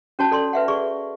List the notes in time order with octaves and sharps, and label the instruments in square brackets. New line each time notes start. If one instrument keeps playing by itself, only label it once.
[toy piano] C#4 F#4 C#5 A5
A4 D5 C6
B4 E5 F#5
G#4 D5 C#6